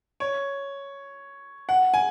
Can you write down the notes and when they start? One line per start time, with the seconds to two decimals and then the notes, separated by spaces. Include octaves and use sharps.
0.20 C#5
1.69 F#5
1.94 G#5